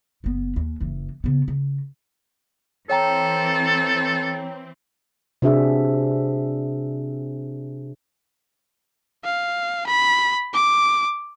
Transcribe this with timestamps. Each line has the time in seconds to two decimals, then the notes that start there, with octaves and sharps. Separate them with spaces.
0.24 F#1 B3
0.56 D#2
0.80 F#1 E3
1.24 C#3 B3
1.48 C#3
2.90 E3 C4 A4 C#5 G5 A#5
5.42 C3 C4 D4 F#4 G#4 E5
9.25 F5
9.87 B5
10.54 D6